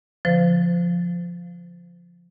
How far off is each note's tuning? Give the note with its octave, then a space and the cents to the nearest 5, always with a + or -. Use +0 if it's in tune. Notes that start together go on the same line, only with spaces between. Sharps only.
D3 -35 F3 +0 C5 -30